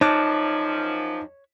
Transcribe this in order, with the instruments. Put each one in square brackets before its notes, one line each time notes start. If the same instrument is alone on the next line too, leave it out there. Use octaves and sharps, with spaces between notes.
[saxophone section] F#2 F3 [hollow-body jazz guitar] D#4 [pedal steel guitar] C#5 F#6 [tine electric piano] A5 D6